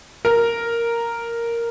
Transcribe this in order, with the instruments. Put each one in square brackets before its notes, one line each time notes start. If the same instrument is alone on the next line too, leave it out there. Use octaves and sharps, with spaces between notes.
[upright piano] A#4